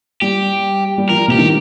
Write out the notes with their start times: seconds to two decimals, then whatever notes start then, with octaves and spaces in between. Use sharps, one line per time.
0.22 G3 G4
0.98 G3
1.09 F3 A#4
1.28 C3 G4
1.38 D#3